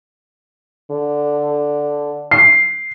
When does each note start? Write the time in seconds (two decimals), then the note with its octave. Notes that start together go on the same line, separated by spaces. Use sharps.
0.91 D3
2.31 C7